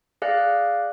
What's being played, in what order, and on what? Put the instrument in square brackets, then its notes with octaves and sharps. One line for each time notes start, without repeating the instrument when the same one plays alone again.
[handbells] G#4 D5 F5 D6 F#6